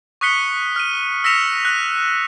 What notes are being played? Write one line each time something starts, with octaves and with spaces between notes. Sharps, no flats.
C#6 D#6 F#6 B6 C#7 G7
F6 D#7
E6 A#6 B6 C#7 E7 F7
F#6